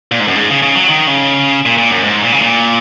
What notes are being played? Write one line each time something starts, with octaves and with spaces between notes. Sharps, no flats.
A#2
G#2
F#2
G#2
C#3
C#3
F#3
D#3
C#3
A#2
A#2
F#2
G#2
A#2
C#3
A#2